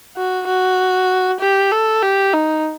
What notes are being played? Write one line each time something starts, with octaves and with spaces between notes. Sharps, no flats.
F#4
F#4
G4
A4
G4
D#4